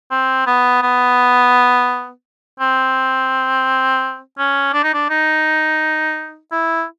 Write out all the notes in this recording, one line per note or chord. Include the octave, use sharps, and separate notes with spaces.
C4
B3
B3
C4
C#4
D4
D#4
D4
D#4
E4